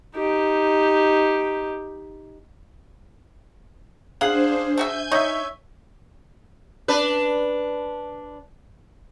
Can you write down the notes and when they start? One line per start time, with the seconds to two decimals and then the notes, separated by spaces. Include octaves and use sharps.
0.15 D#4 G4
4.21 D4 G#4 C5 F5 F#5 F#7
4.77 A3 F#4 E5 G#5 G6 G#6
5.11 D#4 C#5 E5
6.88 D4 B4